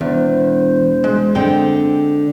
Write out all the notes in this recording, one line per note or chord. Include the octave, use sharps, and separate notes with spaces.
E1 E2 C5
G#3
D3 G#3 C4 G5